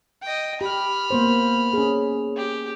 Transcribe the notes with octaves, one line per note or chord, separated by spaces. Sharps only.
D#5 G5
G4 B5 F6
A#3 B3 C5
C#4 G#4
G4